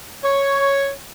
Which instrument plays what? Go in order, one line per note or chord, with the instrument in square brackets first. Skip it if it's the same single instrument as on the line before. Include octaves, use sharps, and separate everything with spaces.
[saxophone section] C#5